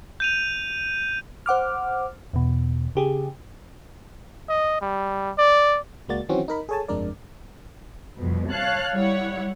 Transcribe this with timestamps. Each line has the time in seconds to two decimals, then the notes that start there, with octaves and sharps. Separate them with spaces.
0.20 G6 D#7 F7
1.46 C5 F#5 D6 F6
2.33 E2 B2
2.95 C#3 G4 G#4
4.49 D#5
4.82 G3
5.38 D5
6.08 C#2 G#3 A#3 F#4 D5 A6
6.29 D#3 E3 F#3 C4 C#4 F#4
6.48 D#4 A#4 B5
6.69 G#4 A4 C#5 G#5 A5
6.88 G1 F2 G#3 D4 A#4 D5
8.17 C2 F2 B2
8.51 C#5 F5 A5 F#6
8.95 G3 E4 C#5 F#5